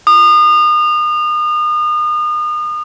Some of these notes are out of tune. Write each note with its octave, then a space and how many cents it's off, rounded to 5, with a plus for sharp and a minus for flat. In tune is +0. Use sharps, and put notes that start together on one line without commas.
D#6 -35